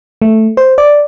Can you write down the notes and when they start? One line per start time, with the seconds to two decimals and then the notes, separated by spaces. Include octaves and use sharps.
0.22 A3
0.57 C5
0.78 D5